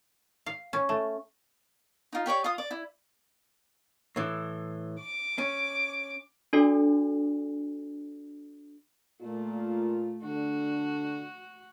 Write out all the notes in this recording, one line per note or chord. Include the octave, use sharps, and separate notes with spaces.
F5
C#4
A3
D#4 F4
G4 C#5 D5 C#6
F4 D#6
D5
E4
A2 E3
D6
C#4
D4 F#4 A4 D5 G#5
A#2 A3 F4
D3 F#4